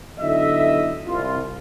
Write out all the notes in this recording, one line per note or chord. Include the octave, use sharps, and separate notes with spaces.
B1 D3 E4 D#5 E5
C2 F4